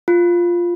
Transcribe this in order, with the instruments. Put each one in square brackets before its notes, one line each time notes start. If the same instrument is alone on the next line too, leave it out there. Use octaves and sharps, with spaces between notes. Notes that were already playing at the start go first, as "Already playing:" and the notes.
[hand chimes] F4